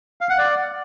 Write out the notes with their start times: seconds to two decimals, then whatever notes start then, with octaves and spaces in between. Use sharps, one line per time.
0.21 F5
0.30 F#5
0.38 D5